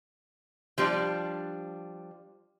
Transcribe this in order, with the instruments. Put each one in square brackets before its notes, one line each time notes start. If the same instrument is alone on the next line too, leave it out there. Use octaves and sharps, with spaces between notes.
[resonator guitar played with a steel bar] F3 G3 D4